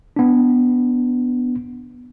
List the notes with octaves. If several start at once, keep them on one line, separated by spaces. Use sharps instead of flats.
B3 D4